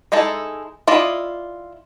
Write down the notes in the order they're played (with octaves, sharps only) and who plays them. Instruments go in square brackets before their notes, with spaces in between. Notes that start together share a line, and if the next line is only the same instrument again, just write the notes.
[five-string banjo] G#3 D#4 E4 A4
E4 F4 D5 D#5